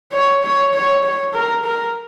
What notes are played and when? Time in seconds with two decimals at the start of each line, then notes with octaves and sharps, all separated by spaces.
0.12 C#5
0.42 C#5
0.73 C#5
1.03 C#5
1.33 A#4
1.64 A#4